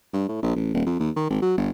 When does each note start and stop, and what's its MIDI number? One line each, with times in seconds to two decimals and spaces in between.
0.13 0.27 43
0.29 0.39 45
0.42 0.52 34
0.56 0.70 33
0.74 0.82 27
0.86 0.95 41
1.00 1.10 39
1.16 1.28 51
1.30 1.39 32
1.42 1.54 54
1.57 1.70 31